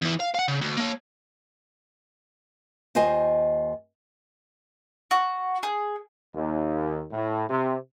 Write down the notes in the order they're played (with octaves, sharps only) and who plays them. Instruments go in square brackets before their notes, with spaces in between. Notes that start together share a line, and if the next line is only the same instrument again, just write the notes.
[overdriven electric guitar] E2 E3
F5
F5 F#5
C#3
D2
A#3 C#5
[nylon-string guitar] D#2 F4 C5 D#5 G#5
[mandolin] F#4
G#4
[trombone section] D#2
A2
C3